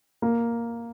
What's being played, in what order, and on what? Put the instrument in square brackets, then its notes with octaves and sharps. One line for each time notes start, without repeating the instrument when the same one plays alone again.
[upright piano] A#3